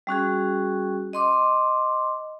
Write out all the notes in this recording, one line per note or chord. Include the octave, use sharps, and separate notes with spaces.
G3 C#4 F#4 G#4
D#5 C6 D6